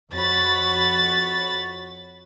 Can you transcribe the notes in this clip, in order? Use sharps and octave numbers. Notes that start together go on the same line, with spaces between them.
F2 F#4 C#5 B5 A6